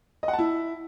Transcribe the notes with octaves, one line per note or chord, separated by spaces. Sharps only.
D#5
F#5
A5
E4